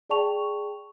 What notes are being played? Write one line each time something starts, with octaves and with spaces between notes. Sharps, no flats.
G#4 D5 G5 A5 C#6 F7